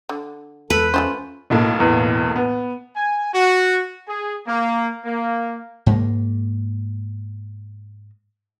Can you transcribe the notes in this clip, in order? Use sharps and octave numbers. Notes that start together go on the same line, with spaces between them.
D3
E2 G#3 A4 B4
A3 C#4 F4 C5
B1 A2 A#3
E2
B3
G#5
F#4
G#4
A#3
A#3
G#2 G#3 A#3